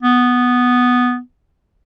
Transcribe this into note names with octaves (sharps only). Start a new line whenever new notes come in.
B3